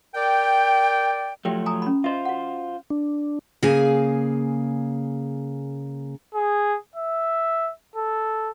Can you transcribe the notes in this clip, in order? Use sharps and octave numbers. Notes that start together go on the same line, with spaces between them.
A#4 D5 G5
F3 F#3 A3 G4 E5 G5
G#5 A#5 D#6
C#4 B5
F4 C5 D#5 E5
F#4 F#5
D4
C#3 A#3 G#4 F5 G#5
G#4
E5
A4